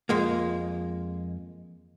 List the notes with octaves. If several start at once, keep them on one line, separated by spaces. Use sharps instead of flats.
F2 G#3 A#3